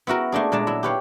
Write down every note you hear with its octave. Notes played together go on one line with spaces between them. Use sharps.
B3 E4 F#4 A#4
A3 A#3 D4 G#4
A#2 G#3 D4 A5 A#5
F#3 E4
G4 B4 C#5 F5